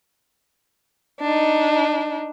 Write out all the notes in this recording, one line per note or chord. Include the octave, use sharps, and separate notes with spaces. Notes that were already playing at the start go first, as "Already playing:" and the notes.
D4 D#4